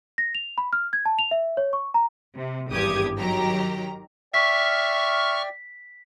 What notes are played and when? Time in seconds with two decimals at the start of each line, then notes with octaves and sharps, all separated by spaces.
0.18 A#6
0.35 F7
0.58 B5
0.73 F6
0.93 G#6
1.05 A5
1.19 F7
1.31 E5
1.57 C#5
1.73 C#6
1.94 A#5
2.34 C3
2.70 G#1 E2 G2 G4 D#6 G#6
3.16 D#3 F#3 G4 A#5
4.34 D5 E5 G5 C#6 F6 B6